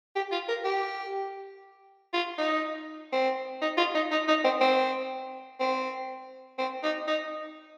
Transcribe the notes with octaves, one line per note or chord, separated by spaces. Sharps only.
G4
F4
A#4
G4
F4
D#4
C4
D#4
F4
D#4
D#4
D#4
C4
C4
C4
C4
D#4
D#4